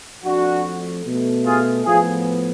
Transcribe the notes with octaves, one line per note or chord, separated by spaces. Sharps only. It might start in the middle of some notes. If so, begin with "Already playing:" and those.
F2 F3 A3 D4 F#4
B2 A3
F4 G#4
A2 F3 B3 F4 G#4